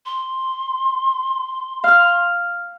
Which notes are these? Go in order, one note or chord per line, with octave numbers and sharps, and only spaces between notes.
C6
F5 F6